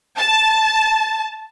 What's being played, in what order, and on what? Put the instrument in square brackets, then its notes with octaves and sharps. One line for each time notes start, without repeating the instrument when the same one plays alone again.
[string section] A5